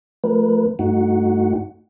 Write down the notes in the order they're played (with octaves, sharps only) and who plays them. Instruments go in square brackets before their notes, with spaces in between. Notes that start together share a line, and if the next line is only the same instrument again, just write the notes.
[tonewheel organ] F3 A3 A#4 B4
G2 A3 D#4 F#4 F#5